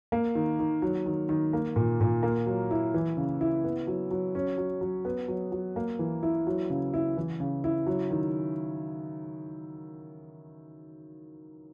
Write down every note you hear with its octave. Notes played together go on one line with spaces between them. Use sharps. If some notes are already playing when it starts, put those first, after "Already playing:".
A#3
D#3
D#3
F#3
D#3
D#3
A#3
A#2
A#2
A#3
F#3
E4
E3
C#3
E4
B3
F#3
F#3
C#4
F#3
F#3
B3
F#3
F#3
A#3
E3
E4
F#3
C#3
E4
E3
C#3
E4
F#3
D#3